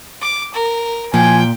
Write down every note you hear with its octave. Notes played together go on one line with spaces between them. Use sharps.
D6
A#4
A#2 F3 G5 G#5